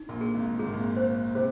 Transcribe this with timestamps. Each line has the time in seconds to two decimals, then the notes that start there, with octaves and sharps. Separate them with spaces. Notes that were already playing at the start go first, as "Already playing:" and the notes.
Already playing: D#4
0.09 A#1 A#2
0.21 G#4
0.34 G#1 G#2
0.59 G#2 G#4
0.67 A#2
0.73 G#1 G#2
0.97 C5
1.35 C3 C5